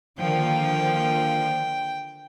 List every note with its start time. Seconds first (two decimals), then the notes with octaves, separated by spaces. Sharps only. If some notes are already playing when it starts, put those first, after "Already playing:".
0.19 D3 D#3 F3 A#3 G5